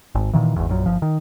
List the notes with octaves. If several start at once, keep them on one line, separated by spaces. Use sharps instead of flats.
G#1
A#2 D#3 E3
G#1 E2
A#1 F#2
G1 F3
D#3